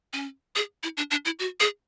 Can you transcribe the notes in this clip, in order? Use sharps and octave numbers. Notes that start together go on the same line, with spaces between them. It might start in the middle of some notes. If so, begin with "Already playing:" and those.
C#4
G#4
E4
D4
D4
E4
F#4
G#4